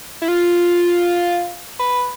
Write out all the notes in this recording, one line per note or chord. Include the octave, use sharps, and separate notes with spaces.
E4
F4
B4